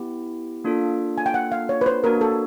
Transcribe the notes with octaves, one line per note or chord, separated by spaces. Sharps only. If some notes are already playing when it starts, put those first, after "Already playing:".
Already playing: B3 E4 G4
A#3 D4 F4 A4
G#5
G5
F#5
F5
C#5
B4
C5
A#3 D4 F#4 A#4
A4